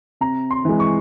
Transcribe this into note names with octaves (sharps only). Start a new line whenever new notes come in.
C3 A#5
C6
E3 G#3
C#6